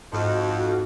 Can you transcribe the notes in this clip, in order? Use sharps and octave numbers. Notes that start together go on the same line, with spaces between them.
F2 G#2 F#4